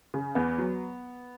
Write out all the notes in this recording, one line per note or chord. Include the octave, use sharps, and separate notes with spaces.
C#3
E2 B3
F#3